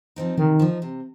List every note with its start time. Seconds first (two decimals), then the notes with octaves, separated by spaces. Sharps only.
0.16 F3 C4 D#4
0.38 C3 D#3
0.60 F3 D#4
0.82 C3